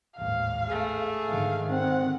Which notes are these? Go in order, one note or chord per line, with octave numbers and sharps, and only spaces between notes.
A1 D#2 G#2 F5
A3 G#4
G#2 D3 D#3 F5
C4 F#5